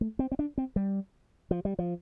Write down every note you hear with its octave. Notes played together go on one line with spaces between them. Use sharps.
A3
C4
C4
D4
C4
G3
F3
G3
F3